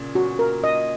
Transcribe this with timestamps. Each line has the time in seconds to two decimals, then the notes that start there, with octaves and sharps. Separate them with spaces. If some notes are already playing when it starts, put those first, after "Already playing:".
Already playing: A#2 C#3
0.15 F#4
0.39 A#4
0.64 D#5